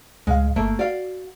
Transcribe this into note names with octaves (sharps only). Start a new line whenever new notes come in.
C#2 A2 G#3 F5
G1 A3 A#3 E5
F#4 D5 F5